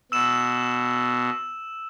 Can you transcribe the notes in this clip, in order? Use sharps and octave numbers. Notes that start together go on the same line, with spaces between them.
B2 E6 E7